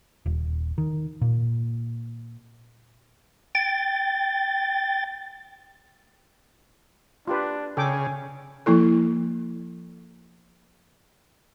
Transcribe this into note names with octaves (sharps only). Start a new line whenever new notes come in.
D#1
D#3
A#2
G5 A6
D4 F4 G4 B4
C#3 A4 G5 G#5 D6
F3 A#3 E4 A4